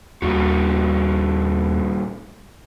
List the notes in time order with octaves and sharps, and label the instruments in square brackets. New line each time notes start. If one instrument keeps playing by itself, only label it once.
[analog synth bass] D#2 [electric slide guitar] A#2 G3 F#4